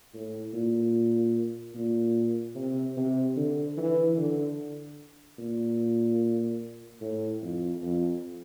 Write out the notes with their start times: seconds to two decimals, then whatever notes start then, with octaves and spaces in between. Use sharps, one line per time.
0.14 A2
0.53 A#2
1.75 A#2
2.55 C3
2.97 C3
3.36 D3
3.77 E3
4.17 D3
5.38 A#2
7.01 A2
7.42 F2
7.82 F2